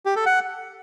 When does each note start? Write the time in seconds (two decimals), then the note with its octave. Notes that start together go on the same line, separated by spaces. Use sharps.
0.06 G4
0.16 A4
0.26 F#5